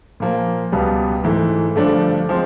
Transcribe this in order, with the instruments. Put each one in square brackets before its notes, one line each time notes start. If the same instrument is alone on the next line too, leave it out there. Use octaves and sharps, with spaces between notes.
[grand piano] A#2 F3 A#3
C#2 B2 G3 B3
G#2 E3 A3
G2 D3 F3 A3 D4
F3 G#3 C4